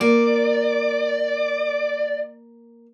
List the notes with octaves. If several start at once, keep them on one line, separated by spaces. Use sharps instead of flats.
A#3 D5